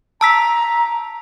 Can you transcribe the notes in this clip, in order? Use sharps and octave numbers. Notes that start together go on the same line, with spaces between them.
A5 A#5 E6 B6